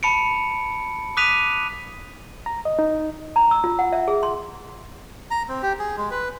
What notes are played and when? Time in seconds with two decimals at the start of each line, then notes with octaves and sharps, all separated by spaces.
0.03 A5 B5 C#7 D7
1.17 D6 D#6 F#6 B6 D#7 F7
2.46 A#5
2.65 D#5
2.79 D#4
3.36 A#5
3.51 E6
3.64 F4
3.79 F#5
3.93 E5
4.08 G#4
4.23 C6
5.31 A#5
5.48 C4
5.63 G4
5.79 G#4
5.97 G#3
6.11 B4